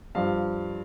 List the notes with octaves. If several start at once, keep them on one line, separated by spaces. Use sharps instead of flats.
G2 F3 F5